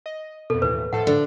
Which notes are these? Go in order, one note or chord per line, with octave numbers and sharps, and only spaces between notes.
D#5
F2 B2 A4
D#2 A2 E3 B4
A2 F3 A4 F#5
D3